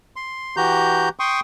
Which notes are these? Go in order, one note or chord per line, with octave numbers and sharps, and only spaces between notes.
C6
E3 F#4 G4 A#5 G6
G5 C6 C#6 D#6